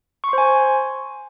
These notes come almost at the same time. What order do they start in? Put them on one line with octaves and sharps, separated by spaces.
C#6 C6 C5 G#5